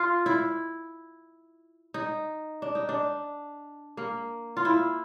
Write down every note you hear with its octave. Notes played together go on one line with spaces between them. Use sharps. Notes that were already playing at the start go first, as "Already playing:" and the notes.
Already playing: F4
E4
D#4
D4
D#4
D4
A#3
F4
E4